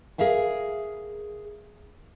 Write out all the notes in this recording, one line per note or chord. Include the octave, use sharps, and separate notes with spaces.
G#4 A#4 E5 F5 G#5